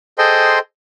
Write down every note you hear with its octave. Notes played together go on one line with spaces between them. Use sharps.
G#4 A4 C5 D#5 G5 C6